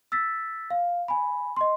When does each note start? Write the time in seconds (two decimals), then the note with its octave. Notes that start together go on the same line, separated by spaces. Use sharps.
0.12 E6 A6 B6
0.70 F5
1.08 G#5 B5
1.56 D#5 C6